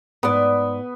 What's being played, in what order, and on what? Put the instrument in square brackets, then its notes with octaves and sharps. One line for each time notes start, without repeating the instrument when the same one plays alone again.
[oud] G#2 D5 [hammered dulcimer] B3